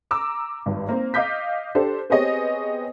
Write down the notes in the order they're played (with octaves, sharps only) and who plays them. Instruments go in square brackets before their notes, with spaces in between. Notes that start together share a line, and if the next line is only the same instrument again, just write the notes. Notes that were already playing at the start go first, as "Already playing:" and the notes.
[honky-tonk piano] A#5 D6 E6
G#1 G2
A#3 C4
D#5 F5 D6 G6 B6
D4 G4 A4 C5 D5
B3 C4 G4 G#4 C#5 D#5